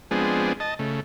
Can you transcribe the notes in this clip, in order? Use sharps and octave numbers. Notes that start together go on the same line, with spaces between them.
F3 G#3 B3 C4 D4 G#4
D#5 A5
C#3 A3